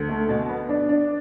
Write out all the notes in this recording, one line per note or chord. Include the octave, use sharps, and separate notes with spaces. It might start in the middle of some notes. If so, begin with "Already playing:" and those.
Already playing: D2
A3
B2
B3
D4
D4